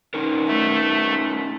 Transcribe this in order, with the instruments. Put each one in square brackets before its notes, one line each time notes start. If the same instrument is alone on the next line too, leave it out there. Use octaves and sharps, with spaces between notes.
[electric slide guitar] C#4 D#4 A#4
[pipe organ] A3